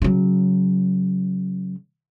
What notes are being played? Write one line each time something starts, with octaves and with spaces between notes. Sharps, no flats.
C#3 F#3